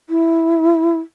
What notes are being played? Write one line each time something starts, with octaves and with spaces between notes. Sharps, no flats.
E4